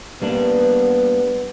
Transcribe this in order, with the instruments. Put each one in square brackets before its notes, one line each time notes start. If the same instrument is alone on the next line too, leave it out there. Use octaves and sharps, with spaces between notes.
[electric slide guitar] G3 A#3 D4 [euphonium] B3